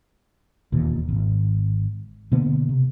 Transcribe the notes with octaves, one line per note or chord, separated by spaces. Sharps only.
E1 D#2 A#2
G#1
B2 D3 A#3 B3
C3